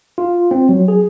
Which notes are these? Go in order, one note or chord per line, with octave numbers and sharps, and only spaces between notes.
F4
C4
F#3
G#4